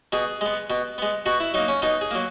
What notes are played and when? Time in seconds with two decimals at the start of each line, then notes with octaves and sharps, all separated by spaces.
0.12 B2 G#4
0.41 G#3 B3
0.70 B2
0.98 G#3 B3
1.26 B2 F#4
1.40 E4
1.54 F#3 A#3 D#4
1.68 C#4
1.82 B2 D#4
2.01 G#4
2.11 F#3 A#3